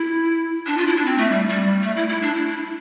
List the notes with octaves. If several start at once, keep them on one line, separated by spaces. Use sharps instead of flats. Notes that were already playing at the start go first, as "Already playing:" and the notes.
Already playing: E4
D4
F4
E4
D4
C4
A3
G3
G3
A3
E4
E4
D4
E4
E4